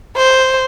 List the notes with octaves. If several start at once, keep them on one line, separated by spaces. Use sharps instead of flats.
C5